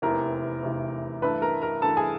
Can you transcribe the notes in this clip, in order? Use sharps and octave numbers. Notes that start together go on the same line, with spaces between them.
F1 E2 C3 E3 A#4 A#5
F1 E2 C3 E3
G2 E3 A3 B4 B5
A#4 A#5
A#4 A#5
G2 E3 A3 A4 A5
G#4 G#5